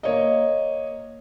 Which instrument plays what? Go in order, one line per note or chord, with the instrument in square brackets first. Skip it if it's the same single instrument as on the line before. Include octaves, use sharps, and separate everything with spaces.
[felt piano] A#3 C#5 D#5